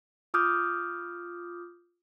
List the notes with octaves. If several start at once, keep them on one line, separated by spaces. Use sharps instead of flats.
F4 D6 D#6 F6 G6